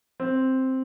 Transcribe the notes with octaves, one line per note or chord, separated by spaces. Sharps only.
C4